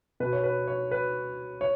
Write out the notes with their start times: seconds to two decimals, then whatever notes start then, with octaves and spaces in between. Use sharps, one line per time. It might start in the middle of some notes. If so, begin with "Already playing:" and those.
0.20 B2 B4
0.33 C#5
0.44 B4
0.68 C#5
0.91 B4
1.61 C#5